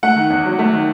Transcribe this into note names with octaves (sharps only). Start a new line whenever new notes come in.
A3 F#5
D#3
E2
F#3
A3
D#3